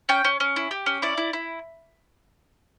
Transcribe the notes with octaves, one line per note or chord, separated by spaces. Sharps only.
C#4 G5
C#4
C#4
E4
G4
C#4
E4 D5
E4
E4